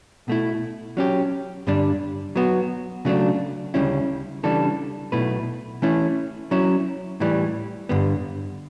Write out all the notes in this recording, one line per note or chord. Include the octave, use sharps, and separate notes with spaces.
B2 A3 E4
F#3 C#4 G4
G2 D3 G3 D4
F#3 B3 F#4
C#3 F#3 A3 D4
D2 C#3 G3 C#4 E4
C#3 E3 G3 D4 A4
B1 B2 A3 E4 B4
E3 A3 C#4 E4
F#3 C#4 E4
A2 E3 G3
G2 D3 G3 B3